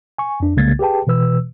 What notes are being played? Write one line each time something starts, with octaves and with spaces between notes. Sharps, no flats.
G#5 C#6
F2 D4
C2 C#3 G#3 A#3 G#6 A6
G4 G#4 B4 G5 A5
B2 E3 B4 E6